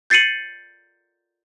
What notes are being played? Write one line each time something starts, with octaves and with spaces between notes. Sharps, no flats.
G6 A6 C7 C#7 D#7 F#7